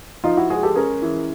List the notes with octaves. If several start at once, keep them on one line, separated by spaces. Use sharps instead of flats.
F3 D#4 F4
E4 F#4
G#3 F#4 G#4
G4 A4
C#4 G#4 A#4
E3